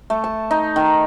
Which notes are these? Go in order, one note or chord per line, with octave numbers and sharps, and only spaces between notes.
A3
A5
D#4
D#3